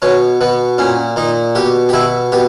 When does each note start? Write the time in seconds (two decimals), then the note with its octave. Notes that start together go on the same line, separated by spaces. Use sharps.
0.02 B2 C#4
0.41 B2 B3
0.78 A#2 C#4
1.16 A#2 D#4
1.55 B2 G4
1.89 G4
1.93 B2 E4
2.32 B2 G4